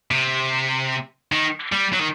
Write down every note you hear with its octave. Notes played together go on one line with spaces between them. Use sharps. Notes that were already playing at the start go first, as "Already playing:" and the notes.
C3
D#3
G3
F#3
D#3